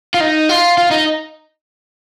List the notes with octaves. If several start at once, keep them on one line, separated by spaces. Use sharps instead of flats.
F4
D#4
F4
F4
D#4